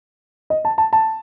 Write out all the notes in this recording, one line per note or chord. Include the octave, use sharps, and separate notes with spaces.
D#5
A5
A5
A5